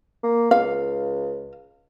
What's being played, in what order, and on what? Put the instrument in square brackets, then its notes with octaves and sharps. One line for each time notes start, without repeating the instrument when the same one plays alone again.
[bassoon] A#3
[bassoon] C#2 [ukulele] F5